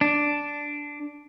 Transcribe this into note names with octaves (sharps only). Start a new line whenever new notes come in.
D4